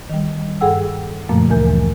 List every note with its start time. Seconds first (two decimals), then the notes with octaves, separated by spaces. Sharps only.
0.10 D#3 G3
0.61 G2 G#4 A4 F#5 G5 E6
1.29 F#2 A#2 C#3 F3 A3 A#3
1.50 D2 E3 A#4 G#5 G6